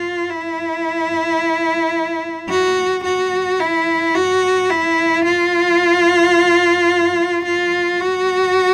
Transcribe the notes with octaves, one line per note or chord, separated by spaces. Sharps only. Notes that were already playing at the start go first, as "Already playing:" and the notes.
Already playing: F4
E4
F#4
F#4
E4
F#4
E4
F4
F4
F#4